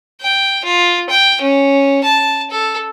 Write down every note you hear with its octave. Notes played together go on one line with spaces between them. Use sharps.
G5
F4
G5
C#4
A5
A4